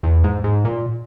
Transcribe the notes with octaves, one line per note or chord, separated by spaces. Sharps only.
E2
G#2
G#2
A#2